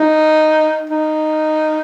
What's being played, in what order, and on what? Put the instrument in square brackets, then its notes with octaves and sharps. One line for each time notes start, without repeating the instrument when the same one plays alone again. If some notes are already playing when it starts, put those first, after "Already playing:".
Already playing: [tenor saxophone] D#4
D#4